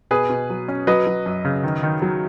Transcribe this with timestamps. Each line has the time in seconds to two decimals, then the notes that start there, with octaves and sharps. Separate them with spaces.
0.11 B2 G#4 B4
0.30 B2
0.50 F#3
0.68 C#4
0.87 F#3 B4 D#5
1.06 F#3
1.26 F#2
1.45 C#3
1.63 D#3
1.83 D#3
2.02 F#3